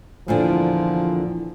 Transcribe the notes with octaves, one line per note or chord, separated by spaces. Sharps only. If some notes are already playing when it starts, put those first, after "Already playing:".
E2 A#2 D3 F3